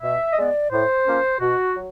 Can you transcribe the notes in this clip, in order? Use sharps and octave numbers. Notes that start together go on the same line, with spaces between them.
B2 E5
D#5
G#3 B3 D5
A2 C5
F3 A#3 C#4
B2 F#4
F#3